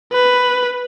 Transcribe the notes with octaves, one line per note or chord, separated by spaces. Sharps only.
B4